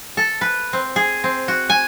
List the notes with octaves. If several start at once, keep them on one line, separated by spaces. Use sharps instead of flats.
A4
B4
C4
G#4
C4
F#4
G#5